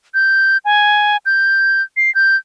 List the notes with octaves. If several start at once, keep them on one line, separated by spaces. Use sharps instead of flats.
G6
G#5
G6
C7
G6